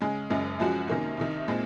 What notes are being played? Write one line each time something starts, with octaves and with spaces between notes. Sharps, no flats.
C#3 G#3 C#4
F#1 F#2 C#3 G#3 C#4
F#2 F3 G#3 C#4 F#4
C3 D#3 A#3 C#4
C2 C3 D#3
A#2 G#3 C4